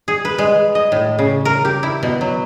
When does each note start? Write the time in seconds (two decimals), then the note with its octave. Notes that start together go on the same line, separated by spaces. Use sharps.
0.08 G#4
0.25 B4
0.38 G#3
0.75 D#5
0.92 A2
1.19 C#3
1.45 A#4
1.65 G4
1.83 E4
2.03 B2
2.21 F#3